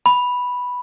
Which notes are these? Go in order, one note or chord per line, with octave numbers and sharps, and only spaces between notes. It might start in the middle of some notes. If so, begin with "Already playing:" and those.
B5